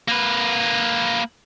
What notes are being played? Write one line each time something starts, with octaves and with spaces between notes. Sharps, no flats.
A#3 B4